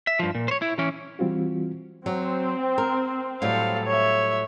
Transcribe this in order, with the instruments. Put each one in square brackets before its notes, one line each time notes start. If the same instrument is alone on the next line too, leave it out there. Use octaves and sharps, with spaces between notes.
[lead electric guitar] E5
G2 F3
A#2
C5 C#5
E4
E3 C#4
[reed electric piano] E3 G3 C4 F4 F#4
[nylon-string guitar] F#3 [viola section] C4
[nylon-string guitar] A#4
[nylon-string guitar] A2 F#3 G3 [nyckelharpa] A4 F5
[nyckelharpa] C#5 E5